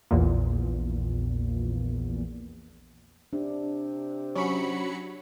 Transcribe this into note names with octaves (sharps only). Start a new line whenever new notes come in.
A#1 E2 A#2
C3 D4
F#3 C#4 B5 C#6 C#7